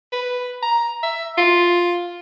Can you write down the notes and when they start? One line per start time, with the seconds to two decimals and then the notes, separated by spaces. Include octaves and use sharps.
0.12 B4
0.63 A#5
1.03 E5
1.37 F4